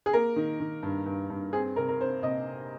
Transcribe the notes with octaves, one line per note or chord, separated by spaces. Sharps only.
G#4
A#3 A#4
D#3
D#3
G2
G2
G2
C4 G#4
C3 A#4
A#4
C4 C5
C3 D#5